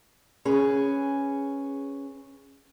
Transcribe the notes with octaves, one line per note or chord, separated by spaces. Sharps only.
C#4 G#4 B4